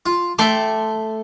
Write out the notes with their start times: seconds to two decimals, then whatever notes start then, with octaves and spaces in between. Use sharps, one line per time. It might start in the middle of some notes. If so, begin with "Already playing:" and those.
0.06 F4
0.39 A3 E5 G5 C6 D6